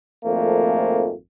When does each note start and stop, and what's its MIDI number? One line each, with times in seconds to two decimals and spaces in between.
0.25 1.12 32
0.25 1.12 41
0.25 1.12 53
0.25 1.12 57
0.25 1.12 58